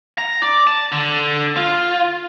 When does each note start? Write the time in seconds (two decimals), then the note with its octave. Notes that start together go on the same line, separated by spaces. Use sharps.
0.18 A#5
0.42 D5
0.67 A5
0.92 D3
1.57 F4